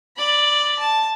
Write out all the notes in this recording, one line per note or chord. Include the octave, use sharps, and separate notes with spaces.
D5 B5
A5